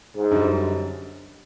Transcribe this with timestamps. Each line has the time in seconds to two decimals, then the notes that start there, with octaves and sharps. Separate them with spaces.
0.16 G#2
0.31 F#2 D3 G3